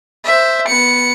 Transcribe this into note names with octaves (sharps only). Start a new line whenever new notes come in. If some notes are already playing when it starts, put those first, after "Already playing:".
C5 E5
B3 C#7